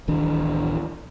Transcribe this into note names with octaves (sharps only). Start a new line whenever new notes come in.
D1 A1 D#3 D4